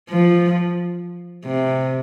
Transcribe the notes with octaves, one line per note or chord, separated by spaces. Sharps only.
F3
C3